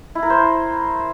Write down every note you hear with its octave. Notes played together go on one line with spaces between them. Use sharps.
E4
A#4
C5